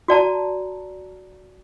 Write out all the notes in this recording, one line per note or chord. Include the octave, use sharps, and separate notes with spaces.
F#4 D5 A5 A#5